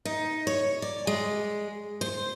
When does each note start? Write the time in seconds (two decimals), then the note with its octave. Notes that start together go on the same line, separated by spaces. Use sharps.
0.05 D#4
0.47 C#5
0.82 D5
1.07 G#3
2.01 C5